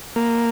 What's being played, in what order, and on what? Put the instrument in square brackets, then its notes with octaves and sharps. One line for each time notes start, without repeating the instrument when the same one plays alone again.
[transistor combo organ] A#3